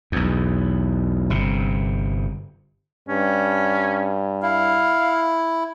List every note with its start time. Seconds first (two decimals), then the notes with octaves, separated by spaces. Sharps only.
0.12 B1 E2
1.30 G1 C3
3.09 G2 C#4
4.42 E4 F5